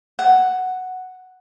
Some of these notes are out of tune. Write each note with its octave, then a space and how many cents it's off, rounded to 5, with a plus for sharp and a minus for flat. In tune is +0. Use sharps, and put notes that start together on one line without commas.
F#5 +0